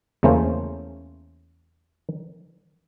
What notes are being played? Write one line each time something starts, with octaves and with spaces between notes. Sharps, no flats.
E2 C#3 A3 A#3 C#4 C5